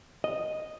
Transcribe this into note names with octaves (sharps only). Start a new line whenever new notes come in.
D#5